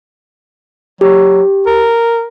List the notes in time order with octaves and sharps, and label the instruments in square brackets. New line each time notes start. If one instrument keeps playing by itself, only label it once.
[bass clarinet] F#3 [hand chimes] G4
[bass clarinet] A#4